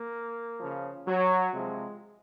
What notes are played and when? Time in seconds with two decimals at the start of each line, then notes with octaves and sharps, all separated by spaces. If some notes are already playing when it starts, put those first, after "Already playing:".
Already playing: A#3
0.58 C#3 F3
1.06 F#3
1.52 C3 F3 G#3